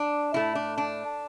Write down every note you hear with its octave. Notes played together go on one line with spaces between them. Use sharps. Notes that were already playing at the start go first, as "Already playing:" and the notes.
Already playing: D4
A2 A3 E4
D4
D4